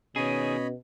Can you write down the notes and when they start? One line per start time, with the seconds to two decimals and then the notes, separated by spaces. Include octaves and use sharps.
0.16 B2 D#3 C#4 G#4 C#5 D#5 B5